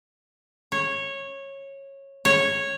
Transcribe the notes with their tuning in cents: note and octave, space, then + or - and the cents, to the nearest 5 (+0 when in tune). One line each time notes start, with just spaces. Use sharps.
C#5 -15
C#5 -10